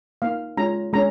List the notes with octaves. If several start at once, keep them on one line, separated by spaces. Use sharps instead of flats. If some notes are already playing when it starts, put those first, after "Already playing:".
A#3 D#4 F5
G#3 C#4 F4 A#5
G#3 C#4 A#5